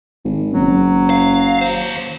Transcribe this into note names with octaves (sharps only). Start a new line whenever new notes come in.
G#1
F#1 F#3
F5
D#2 C5